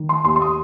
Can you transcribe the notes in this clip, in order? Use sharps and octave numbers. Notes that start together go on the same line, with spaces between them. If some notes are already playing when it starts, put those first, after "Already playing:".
Already playing: D#3
C6
D#2 C6
C6
D#6